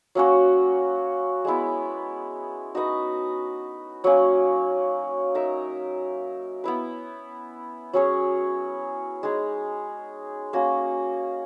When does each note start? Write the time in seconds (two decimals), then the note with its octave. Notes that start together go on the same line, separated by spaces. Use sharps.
0.15 F#3 A#3 C#4 F#4
1.45 G#3 B3 E4
2.75 D#4 F#4 B4 D#5
4.04 F#3 A#3 C#4
5.35 D#4 A#4 E5
6.64 B3 E4 B4
7.93 F#3 C#4 G#4 C#5
9.23 G#3 D#4 G#4
10.53 A#3 C#4 F#4